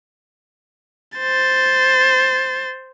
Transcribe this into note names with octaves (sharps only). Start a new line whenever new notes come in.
C5 A6